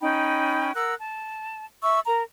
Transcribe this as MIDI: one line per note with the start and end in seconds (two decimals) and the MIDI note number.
0.01 0.72 61
0.01 0.72 63
0.01 0.72 79
0.01 0.72 83
0.75 0.94 70
0.75 0.94 78
0.75 0.94 88
0.75 0.94 90
0.98 1.65 81
1.82 1.99 76
1.82 1.99 85
1.82 1.99 88
2.05 2.22 70
2.05 2.22 82